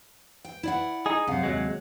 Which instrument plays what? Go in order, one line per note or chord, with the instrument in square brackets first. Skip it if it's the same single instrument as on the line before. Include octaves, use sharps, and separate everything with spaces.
[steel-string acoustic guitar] G5
E4 D5 F#5
[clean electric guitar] D#4 G#4
[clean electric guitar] C#2 F#2 [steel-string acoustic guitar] C3 F5 F#5
[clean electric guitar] D#2 F#3 G#3